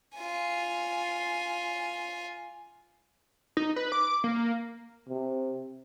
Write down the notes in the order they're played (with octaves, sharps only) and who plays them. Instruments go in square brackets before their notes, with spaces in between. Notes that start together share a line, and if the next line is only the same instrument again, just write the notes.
[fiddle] F4 G#5
[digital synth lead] D#4
B4
D6
A#3
[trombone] C3